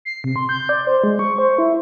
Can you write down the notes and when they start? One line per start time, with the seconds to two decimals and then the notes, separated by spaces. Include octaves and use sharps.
0.05 C7
0.24 C3
0.36 C6
0.49 G6
0.69 D5
0.87 C5
1.04 G#3
1.19 C#6
1.39 C5
1.58 E4